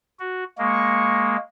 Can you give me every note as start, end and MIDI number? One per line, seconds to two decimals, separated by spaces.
0.20 0.44 66
0.58 1.36 56
0.58 1.36 58
0.58 1.41 85